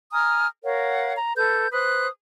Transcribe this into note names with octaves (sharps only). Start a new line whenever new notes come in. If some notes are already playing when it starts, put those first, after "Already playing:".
G#5 A#5 D#6 F6
A#4 C#5 F5 F#5
A#5
A4 B4 G6
B4 C5 D#6 F#6